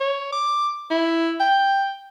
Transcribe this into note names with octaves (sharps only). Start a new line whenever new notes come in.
C#5
D6
E4
G5